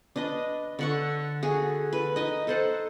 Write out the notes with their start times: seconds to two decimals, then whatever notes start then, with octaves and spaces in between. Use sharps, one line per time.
0.16 D4 B4 D#5
0.79 D3 F#5 C#6
1.43 F#4 G#4
1.93 B4
2.16 D#4 D#5
2.47 A4 C5 F#5